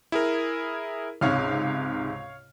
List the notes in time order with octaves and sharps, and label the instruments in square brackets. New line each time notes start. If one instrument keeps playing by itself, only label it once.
[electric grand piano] E4 G#4 A#4
[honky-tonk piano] C#2 G#2 C3 [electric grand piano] C#5 F5 F6